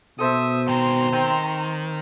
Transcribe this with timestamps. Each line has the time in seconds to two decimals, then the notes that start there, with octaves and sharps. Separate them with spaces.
0.19 B2 A4 C5 E5 D#6
0.69 D#3 C4 A#5 C6
1.13 D#3 C4